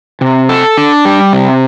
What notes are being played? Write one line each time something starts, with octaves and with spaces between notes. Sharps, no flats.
C3
A4
D4
G3
C3